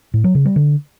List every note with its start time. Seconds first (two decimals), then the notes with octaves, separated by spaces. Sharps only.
0.14 A2
0.24 F#3
0.35 C#3
0.45 G3
0.56 D3